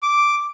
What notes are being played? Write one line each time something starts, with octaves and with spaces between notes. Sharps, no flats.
D6